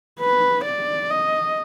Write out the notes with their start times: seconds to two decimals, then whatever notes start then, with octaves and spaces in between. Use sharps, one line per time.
0.20 B4
0.65 D5
1.10 D#5